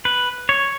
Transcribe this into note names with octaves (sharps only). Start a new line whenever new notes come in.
B4
C#5